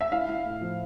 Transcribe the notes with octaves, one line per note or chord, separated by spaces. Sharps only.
E5
E4 F5
E4
A2
F3